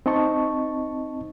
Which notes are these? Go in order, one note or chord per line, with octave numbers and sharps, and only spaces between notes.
C4 D#4 D#5 A5 C#6